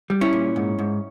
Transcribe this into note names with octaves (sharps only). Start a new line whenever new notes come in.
G3
C#4 E4
A#2
G#2
G#2